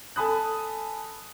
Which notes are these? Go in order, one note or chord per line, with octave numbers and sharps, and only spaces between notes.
A4 G#5 A5 B5 D#6 F#6